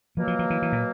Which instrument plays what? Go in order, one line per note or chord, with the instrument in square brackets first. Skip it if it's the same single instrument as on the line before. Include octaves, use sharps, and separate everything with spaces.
[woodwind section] B2 F#3 A#3 [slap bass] F3
[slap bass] F3
F3
E3
E3
A#2